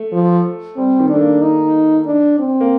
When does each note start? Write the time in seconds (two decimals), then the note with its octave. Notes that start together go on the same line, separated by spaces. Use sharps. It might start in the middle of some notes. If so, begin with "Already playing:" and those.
Already playing: A3
0.13 F3
0.77 G3 C4
0.99 D#3
1.09 A3 D4
1.21 A#3
1.42 D#4
2.06 D4
2.39 C4
2.61 A#3